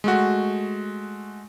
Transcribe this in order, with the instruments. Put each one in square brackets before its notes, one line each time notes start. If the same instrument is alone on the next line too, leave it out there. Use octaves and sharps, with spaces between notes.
[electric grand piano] G#3 A3 F#4